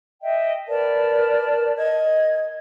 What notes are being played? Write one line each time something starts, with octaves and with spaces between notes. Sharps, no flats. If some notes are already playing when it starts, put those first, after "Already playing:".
D#5 E5 G5
A#4 B4 D5 A5
D#5 G#6